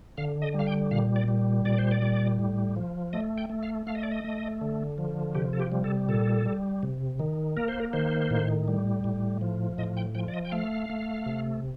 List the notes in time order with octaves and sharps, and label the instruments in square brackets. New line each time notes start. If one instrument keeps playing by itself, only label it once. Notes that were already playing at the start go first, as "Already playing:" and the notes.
[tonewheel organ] D3 F5
D#5
G3 F5
G5
A#2 F5
D5
G3
A#2 D5
C5
D5
G3
A2
F3
A3 D#5
G5
A3
F5
A3 F5
D#5
D5
D#5
A3
D3
F3
C3 G4
A4
G4
G3
A4
A#2 A4
G3
C3
D#3
A#3 A#4
C5
A#4
D#3 C5
A2
G3
A2
F3
A2 D#5
G5
F3 G5
D5
D#5
G5
A3 F5
A3
C3